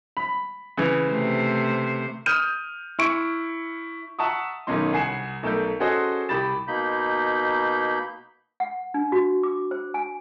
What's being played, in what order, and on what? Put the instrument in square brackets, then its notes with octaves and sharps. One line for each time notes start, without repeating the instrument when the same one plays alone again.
[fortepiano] B5
C#3 E3
[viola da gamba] C3 A3 C5
[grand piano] D#6 F6 G6 D#7
E4 C#6 D7
E5 F#5 A5 A#5 C#6 D#6
B1 D#3 C#4 D#4 C6
C2 F#5 G#5 C7 E7
B1 A3 A#4 G6
C#4 F#4 G#4 A4 C5 D#5
C2 G4 B5 A6 E7
[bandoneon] B2 A#3 D#4 B5 G6
[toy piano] F#5
D4
F#4
D6
C5
G#5